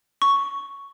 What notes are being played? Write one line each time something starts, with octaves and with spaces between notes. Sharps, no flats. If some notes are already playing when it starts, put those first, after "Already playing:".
C#6